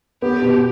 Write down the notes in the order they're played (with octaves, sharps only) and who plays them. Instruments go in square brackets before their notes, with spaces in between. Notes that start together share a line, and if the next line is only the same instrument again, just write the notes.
[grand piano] B3 [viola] G4
[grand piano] B2